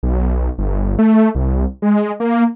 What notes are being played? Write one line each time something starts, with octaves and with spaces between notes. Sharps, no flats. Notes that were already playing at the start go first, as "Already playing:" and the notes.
B1
G1
A3
C2
G#3
A#3